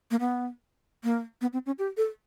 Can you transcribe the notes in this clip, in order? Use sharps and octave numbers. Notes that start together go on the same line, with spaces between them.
A#3
B3
A#3
B3
C4
C#4
G4
A4